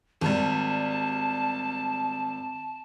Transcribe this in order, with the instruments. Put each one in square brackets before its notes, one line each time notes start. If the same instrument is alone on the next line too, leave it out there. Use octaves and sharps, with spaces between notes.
[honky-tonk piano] G#1 G3 [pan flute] A5